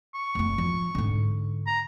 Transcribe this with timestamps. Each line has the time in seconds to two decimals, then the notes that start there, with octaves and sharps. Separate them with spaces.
0.15 C#6
0.35 F1 E4
0.58 F3
0.95 G#2 D3
1.67 A#5